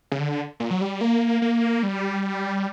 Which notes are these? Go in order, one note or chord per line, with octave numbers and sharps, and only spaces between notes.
C#3
D3
A#2
F#3
G3
A#3
A#3
G3